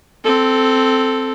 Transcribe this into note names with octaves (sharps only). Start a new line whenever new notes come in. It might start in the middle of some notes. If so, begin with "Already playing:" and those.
C4 A4